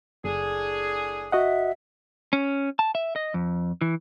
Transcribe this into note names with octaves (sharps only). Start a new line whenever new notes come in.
F#1 A2 D4 G#4
F#4 D#5 E5 F#5
C#4
A5
E5
D#5
F2
E3